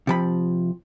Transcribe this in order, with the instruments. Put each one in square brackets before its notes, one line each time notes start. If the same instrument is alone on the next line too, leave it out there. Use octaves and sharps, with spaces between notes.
[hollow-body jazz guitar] C3 F3 B5